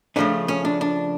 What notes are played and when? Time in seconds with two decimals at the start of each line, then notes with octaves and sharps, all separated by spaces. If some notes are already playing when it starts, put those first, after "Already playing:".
0.16 C#3 F3 A3 C#4 D4
0.48 C#4
0.65 D4
0.81 D4